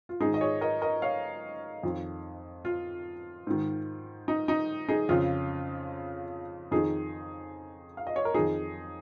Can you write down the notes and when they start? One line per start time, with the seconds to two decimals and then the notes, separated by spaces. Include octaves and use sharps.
0.09 F4
0.20 G#2 D#3 D#4 G#4
0.34 D#5
0.41 G#4 C#5
0.61 A#4 D#5
0.82 A#4 D#5
1.02 C#5 F5
1.83 F2 D#3
2.65 F4
3.47 G#2 D#3
4.28 D#4
4.48 D#4
4.89 D#4 G#4
5.09 F2 C#3 F4
6.71 F2 D#3 D#4 G#4
7.97 F5
8.07 D#5
8.16 C#5
8.25 A#4
8.34 F2 D#3 D#4 G#4